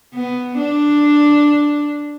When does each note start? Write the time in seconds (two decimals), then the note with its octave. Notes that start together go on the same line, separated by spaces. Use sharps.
0.15 B3
0.58 D4